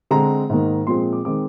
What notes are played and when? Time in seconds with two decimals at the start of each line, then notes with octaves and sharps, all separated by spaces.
0.11 D3 G#3 C4 A#5
0.49 G#2 D#3 A#3
0.87 A#2 F3 G#3 C4 C6
1.13 D6
1.25 D#3 G#3 C4 D6